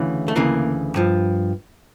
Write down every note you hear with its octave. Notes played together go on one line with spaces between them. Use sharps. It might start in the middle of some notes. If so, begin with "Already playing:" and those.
Already playing: D2 C#3 E3
A3
D2 C#3 E3 A#3
G2 F3